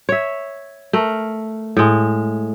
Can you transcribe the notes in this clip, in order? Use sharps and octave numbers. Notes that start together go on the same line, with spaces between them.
C#5 E5
A3 A#4
A2 G#3